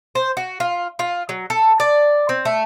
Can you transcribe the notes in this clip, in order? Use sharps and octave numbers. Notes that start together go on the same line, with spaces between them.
C5
F#4
F4
F4
F#3
A4
D5
C4
A3